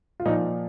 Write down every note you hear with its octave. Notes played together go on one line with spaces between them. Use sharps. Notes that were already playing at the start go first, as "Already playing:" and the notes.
F4
A#2 F3 D#4